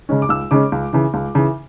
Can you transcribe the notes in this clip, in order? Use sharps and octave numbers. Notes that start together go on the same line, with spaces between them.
C#3 G#3 C#4
D6
C#2 E6
C#3 G#3 C#4 D6
C#2
C#3 E3
C#2
C#3 E3